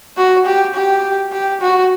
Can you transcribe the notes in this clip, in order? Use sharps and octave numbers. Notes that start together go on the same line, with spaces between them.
F#4
G4
G4
G4
F#4